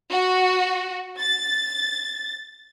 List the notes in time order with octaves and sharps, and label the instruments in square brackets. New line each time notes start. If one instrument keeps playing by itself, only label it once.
[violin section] F#4
A6